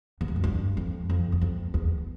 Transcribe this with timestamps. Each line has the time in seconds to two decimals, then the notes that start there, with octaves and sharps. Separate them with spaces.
0.21 E2
0.28 F2
0.36 F#2
0.44 G2
0.77 F2
1.10 F2
1.32 E2
1.41 F2
1.74 E2